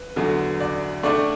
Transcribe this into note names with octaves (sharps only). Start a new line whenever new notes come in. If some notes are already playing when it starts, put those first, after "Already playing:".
Already playing: B4
E2 D3 F#3
D5
A2 A3 D4 D5